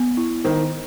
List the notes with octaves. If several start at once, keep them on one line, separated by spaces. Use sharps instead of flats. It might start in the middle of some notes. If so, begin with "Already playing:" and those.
Already playing: B3
E4
D#3 C5